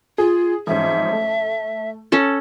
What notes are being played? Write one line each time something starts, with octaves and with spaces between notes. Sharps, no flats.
F4 G#4
A1 F2 G#2 E5
A3
C#4 A4 A5